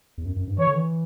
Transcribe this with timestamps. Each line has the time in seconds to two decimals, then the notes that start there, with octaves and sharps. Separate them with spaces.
0.18 E2
0.25 F#2
0.36 F#2
0.47 G2
0.58 E3 C#5
0.67 D3
0.75 E3